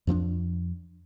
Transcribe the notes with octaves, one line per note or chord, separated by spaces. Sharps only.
F2 F3 A#3 D4